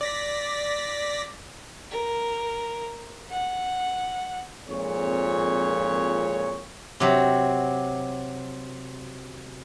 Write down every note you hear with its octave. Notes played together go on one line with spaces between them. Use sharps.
D5 A#6 B6
A#4
F#5
G#1 F2 A#2 C4 G#4 C#5
C3 F#3 G4